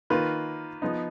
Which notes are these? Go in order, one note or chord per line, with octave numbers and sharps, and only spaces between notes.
D#3 A#3 F4 B4
F3 B3 D#4